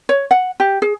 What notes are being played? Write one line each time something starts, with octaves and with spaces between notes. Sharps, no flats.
C#5
F#5
G4
G#4